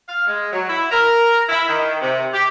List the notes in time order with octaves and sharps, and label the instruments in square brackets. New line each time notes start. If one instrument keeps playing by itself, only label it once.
[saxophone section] F5
G#3
F#3
E4
A#4
E4
D#3
C3
G4